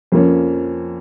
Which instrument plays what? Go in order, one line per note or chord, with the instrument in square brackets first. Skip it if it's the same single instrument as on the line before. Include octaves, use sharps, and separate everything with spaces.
[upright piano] F2 F3 A#3 C#4